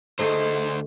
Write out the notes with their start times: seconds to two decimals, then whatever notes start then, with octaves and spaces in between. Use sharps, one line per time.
0.19 D2 A3 D#4 G#4 C5